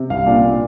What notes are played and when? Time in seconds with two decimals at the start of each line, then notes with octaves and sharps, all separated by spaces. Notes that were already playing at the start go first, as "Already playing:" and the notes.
Already playing: C3
0.10 C2 F5
0.26 A#2 D4
0.43 A#2